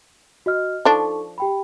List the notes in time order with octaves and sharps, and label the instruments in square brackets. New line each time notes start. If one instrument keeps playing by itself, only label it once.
[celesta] F#4 D#5 F6
[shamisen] F3 D4 [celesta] D#4 A4 C#6
[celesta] G4 G5 B5